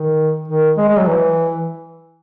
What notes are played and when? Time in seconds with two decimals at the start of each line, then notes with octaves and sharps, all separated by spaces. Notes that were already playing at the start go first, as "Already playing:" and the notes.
Already playing: D#3
0.48 D#3
0.77 G#3
0.89 G#3
0.98 F#3
1.07 E3